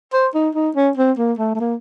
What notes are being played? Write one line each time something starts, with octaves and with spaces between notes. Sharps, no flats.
C5
D#4
D#4
C#4
C4
A#3
A3
A3
A#3